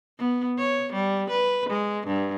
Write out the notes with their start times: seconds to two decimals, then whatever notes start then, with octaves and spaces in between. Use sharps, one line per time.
0.19 B3
0.58 C#5
0.93 G3
1.30 B4
1.69 G#3
2.07 G2